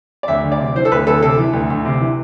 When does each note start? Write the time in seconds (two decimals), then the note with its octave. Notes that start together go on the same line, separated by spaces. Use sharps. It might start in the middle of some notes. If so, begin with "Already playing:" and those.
0.23 D5
0.28 D2 E5
0.44 D2
0.52 D5
0.59 C3
0.76 E3 C5
0.85 A4
0.92 D2 B4
1.07 D2 A4
1.22 C3 A4
1.38 E3
1.53 D2
1.70 D2
1.85 C3
2.00 E3